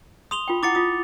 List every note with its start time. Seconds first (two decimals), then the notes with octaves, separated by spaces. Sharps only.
0.31 C6 D#6 F7 G7
0.48 F4 G5
0.63 E4 F#5 D6 A6 C#7
0.75 F4 D#6